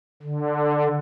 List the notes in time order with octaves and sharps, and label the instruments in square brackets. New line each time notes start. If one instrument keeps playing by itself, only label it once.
[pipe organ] D3